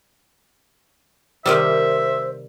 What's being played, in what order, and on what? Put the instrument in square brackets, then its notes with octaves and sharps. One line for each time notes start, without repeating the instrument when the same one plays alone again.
[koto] C3 D#3 G3 [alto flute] C5 [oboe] E5